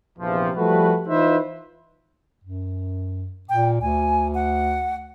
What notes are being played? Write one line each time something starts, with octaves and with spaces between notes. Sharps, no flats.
A#1 E2 C3 E3 F3
F3 G3 A3 F#4 B4
E3 D#4 F4 B4 C5 E5
F#2
A#2 G5
D2 G#5
F#5